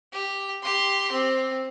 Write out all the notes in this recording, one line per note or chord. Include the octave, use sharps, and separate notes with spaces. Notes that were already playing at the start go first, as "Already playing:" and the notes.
G4
G4 C6
C4